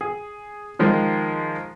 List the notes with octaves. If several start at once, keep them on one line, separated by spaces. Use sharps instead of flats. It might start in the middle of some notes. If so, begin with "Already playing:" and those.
G#4
D#3 F3 G#3